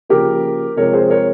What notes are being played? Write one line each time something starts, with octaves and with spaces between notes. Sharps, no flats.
C#3 F3 A#3 G4 A#4
C3 F3 G#3 A#4 C#5
G#4 C5
A#4 C#5